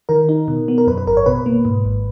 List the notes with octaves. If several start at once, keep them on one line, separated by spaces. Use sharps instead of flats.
D#3 A#4
D#4
B2
B3
A#4
F#2 B4
B4
G#1 A#4
C#5
B2 B4
A#3
G#2
G#1